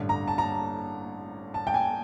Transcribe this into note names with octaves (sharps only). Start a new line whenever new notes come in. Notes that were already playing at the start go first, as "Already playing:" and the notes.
Already playing: A1 G2 D3
A#5
A5
A#5
A5
G5
G#5